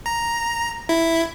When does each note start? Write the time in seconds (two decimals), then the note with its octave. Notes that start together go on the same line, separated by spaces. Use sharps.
0.06 A#5
0.89 E4